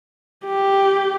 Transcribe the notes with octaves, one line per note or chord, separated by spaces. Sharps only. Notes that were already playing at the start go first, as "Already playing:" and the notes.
G4